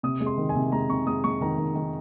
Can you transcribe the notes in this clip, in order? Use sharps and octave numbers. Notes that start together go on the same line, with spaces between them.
C3 D#6
G#3
C6
D#3
G#5
C3
G#3 A#5
C3 C#6
G#3 D#6
G#3 C#6
D#3 A#5
D#3
D#3